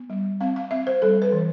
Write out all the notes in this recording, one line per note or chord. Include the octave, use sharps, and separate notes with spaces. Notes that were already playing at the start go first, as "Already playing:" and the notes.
Already playing: B3
G3
C4 F5
F5
C4 E5
C5
G3 A4
B4
E3